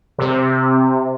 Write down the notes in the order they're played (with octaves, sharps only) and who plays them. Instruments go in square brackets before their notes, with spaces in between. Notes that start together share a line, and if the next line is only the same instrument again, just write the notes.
[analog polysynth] C3